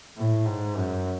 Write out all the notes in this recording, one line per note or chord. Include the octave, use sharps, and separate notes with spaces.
A2
G#2
F#2